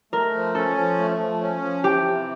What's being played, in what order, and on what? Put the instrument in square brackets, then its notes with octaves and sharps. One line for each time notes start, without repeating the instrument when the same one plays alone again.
[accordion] A3 [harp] A#4
[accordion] F3
[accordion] C#4 [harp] A4
[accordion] F3
A3
F3
C#4
F3
[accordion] E3 [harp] G4
[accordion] C3